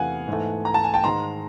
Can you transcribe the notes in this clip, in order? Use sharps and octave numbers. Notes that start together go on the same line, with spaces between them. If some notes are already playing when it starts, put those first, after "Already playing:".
Already playing: E2 C3 E3 A3 F5 F#5 G#5
G#2 E3 A3
A#5
A5
G#5
G5 A5
G#2 D#3 G#3 A#5 C6